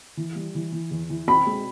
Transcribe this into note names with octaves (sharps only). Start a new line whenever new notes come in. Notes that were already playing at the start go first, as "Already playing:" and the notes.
E3
G3
E3
E3
E2
E3
C4 B5
G#3